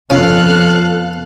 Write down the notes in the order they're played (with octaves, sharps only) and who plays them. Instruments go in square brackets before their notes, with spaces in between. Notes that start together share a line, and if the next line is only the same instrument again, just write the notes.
[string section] F2 A4 F#6 [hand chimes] B3 F4 [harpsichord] C#4 D6 [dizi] F5